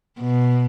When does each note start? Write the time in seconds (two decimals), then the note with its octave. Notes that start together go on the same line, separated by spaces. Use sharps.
0.19 B2